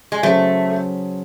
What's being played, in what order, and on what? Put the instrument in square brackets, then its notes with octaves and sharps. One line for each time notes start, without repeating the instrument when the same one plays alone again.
[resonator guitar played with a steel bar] G#3
[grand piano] C#3 F#3 C#4 G#4 C5 [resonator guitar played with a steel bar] A3